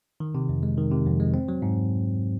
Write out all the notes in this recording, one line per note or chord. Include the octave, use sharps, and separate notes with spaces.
D#3
C3
F2
G#3
D#3
C3
F2
G#3
C4
F#3
G#2